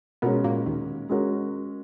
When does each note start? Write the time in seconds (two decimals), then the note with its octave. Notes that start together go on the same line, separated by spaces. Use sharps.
0.22 B2 G#3 B3 C#4 F#4 A#4
0.44 A#2 A#3
0.66 D#2 D#3
1.09 G#3 C#4 F#4 A#4